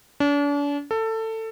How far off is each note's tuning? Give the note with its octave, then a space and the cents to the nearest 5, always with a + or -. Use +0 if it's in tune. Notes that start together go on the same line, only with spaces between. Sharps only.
D4 -40
A4 +20